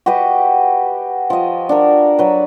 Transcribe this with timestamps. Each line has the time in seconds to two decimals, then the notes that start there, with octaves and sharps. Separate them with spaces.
0.06 F#4 G4 B4 D#5
1.30 F3 D#5
1.69 D4 F#4 A#4
2.19 F#3 B4